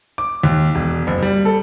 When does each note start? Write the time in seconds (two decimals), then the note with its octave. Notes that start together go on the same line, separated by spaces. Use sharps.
0.18 D6
0.43 D#2
0.75 E1
1.07 F#1
1.22 G3
1.45 A4